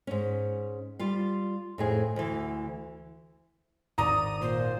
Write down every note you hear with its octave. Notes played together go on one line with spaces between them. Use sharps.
G#2 C#4
G3 F4 F5
F2 A2 G#4
D2 E3
G#1 D5 A#5 D#6
A#2 C5